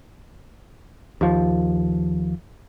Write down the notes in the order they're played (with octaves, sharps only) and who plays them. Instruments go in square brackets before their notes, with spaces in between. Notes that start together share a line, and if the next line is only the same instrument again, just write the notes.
[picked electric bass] D#2 F3